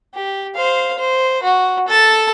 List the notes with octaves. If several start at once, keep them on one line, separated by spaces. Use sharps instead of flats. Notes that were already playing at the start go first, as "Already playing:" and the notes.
G4
C5 F5
C5
F#4
A4 A5